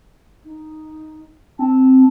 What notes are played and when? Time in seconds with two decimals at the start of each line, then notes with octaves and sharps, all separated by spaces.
0.45 D#4
1.59 C4 A5